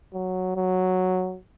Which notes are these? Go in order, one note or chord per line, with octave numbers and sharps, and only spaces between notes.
F#3
F#3